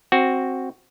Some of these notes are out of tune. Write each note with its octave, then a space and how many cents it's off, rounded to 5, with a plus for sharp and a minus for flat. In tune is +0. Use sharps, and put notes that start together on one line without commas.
C4 +10 F#4 +0